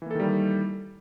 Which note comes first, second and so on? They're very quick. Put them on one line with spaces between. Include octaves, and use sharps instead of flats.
E3 A#3 A4 D#3 G3